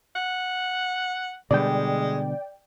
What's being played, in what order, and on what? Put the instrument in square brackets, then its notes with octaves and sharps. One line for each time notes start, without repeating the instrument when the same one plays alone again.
[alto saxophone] F#5
[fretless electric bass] B2 D3 G3 [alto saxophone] G#3 [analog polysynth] D5 G5